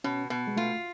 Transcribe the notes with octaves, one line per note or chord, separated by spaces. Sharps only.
B2 C#4
B2 B3
G#3
A3 F4